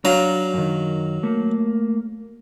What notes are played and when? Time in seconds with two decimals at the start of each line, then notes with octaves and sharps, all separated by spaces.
0.05 F#3 D4 F5 A#5
0.54 F#2 D#3
1.23 A3 A#3